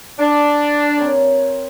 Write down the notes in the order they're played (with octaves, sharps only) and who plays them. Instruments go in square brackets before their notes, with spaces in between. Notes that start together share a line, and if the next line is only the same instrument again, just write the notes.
[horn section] D4
[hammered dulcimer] C4 A#4 C#5